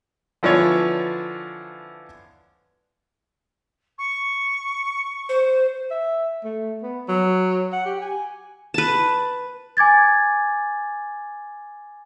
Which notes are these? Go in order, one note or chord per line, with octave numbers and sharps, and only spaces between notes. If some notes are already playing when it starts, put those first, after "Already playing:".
D3 E3 F3 B3 D4 C#5
C#6
C5
E5
A3
B3
F#3
F#5
G4
G#5
B4 A5
G#5 D6 G#6 A6